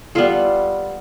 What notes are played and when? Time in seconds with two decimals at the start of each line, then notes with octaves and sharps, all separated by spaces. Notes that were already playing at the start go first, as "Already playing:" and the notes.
0.15 G3 B3 F4 A4